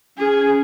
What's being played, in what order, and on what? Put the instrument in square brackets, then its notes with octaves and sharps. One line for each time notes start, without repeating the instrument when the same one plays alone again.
[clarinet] C#4 [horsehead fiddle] G#4